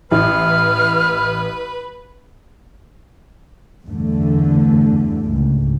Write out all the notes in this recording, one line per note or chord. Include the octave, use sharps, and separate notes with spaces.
A1 E4 B4 F6
E2 G2 D3 A3
C#2 G#2